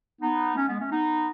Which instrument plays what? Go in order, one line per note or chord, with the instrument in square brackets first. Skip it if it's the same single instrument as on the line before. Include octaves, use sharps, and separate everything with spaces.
[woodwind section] B3 D#4
A3 C#4
G#3 B3
A3 C#4
B3 D#4